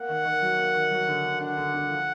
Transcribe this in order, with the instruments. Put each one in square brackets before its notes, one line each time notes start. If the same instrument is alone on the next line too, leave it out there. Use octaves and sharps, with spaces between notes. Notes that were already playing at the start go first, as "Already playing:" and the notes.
Already playing: [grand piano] A#3 [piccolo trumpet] F#5
[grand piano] D#3
D#3
F#3
A#3
D#3
F#3
D3
D3
[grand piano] D4 [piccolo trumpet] F#5
[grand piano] D3
D3
F3